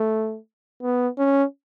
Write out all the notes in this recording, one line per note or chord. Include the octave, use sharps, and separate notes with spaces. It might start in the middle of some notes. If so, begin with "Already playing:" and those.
Already playing: A3
B3
C#4